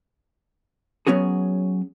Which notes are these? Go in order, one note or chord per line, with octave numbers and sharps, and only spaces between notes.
F#3 B3 C#4 F#4 G#4